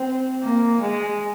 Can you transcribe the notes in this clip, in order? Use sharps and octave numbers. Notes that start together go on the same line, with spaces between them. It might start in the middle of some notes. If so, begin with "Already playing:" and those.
Already playing: C4
A#3
G#3